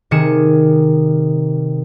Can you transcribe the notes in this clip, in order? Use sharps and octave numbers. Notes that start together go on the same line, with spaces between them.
C3 D#3 G#4 C#7 E7